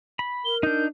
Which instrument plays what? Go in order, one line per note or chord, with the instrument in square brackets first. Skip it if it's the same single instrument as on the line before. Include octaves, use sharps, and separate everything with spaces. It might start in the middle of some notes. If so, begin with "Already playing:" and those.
[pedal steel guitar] B5
[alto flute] A#4 [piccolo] G7
[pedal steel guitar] D4 D#4 [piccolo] G6